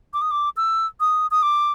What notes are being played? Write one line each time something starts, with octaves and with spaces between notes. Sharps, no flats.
D6
D#6
D6
E6
D#6
D#6
D6